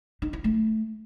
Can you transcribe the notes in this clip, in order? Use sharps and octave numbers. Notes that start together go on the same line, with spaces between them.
D#4
E4
A3